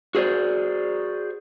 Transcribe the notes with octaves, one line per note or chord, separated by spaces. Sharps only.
F#4 G#4 C5 D5